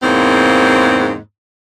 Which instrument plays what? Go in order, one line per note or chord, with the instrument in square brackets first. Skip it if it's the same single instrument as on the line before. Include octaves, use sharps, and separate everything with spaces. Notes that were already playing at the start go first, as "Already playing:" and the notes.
[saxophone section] E2 G#2 C#3 A#3 C4